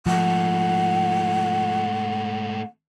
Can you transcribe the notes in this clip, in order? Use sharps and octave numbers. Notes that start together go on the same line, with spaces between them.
G#2 F3 A3 F#5